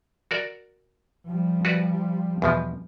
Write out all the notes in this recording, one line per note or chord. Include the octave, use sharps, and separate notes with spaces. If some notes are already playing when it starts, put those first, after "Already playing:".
F#4 A#4 D5
F3 G3
F#4 B4 D5
E2 B2 F3